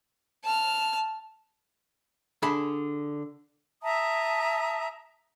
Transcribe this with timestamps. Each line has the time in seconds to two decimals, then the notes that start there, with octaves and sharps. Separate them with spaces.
0.44 A5 F6
2.42 D3 G#4 A5 B5
3.83 E5 A5 A#5 D#6